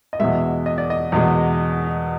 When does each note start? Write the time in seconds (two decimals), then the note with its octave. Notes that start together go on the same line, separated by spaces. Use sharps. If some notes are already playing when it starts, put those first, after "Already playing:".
0.13 D#5
0.19 E2 B2 G#3 E5
0.66 D#5
0.78 D5
0.90 D#5
1.12 E2 B2 G#3